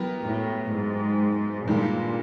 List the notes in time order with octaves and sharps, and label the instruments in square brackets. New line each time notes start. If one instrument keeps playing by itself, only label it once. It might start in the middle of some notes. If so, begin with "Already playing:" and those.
Already playing: [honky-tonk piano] F#3 B3 E4 G4 A#4
[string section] A2
G#2
[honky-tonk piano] G2 D#3 G#3 [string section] A#2